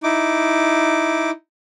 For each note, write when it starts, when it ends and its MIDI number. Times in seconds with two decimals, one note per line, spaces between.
0.03 1.30 63
0.03 1.30 64
0.03 1.30 86